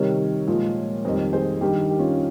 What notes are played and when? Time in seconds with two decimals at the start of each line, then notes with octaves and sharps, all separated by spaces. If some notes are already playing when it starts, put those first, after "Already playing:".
Already playing: C3 D#3 G3 A#4 C#5
0.47 A#2 F3 G#3
1.05 F2 D#3 G3 C5 D#5
1.33 G#4 C5
1.61 G2 D#3 G3 G4 A#4
1.89 G4
1.99 C#4 F4